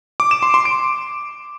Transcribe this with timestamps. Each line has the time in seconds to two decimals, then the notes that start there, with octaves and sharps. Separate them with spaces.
0.20 D6
0.31 E7
0.43 C6
0.54 C6
0.65 D7